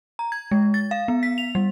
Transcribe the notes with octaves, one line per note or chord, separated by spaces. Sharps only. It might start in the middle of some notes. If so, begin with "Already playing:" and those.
A#5
G#6
G#3
A6
F5
B3
B6
F7
G3